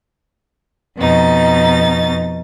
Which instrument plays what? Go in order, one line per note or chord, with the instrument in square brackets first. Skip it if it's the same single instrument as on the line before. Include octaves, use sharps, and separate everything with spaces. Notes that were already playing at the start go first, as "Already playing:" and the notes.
[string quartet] F2 B2 D#4 A6